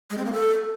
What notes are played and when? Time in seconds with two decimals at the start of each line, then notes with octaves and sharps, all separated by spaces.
0.10 G#3
0.18 C4
0.25 A#3
0.33 A4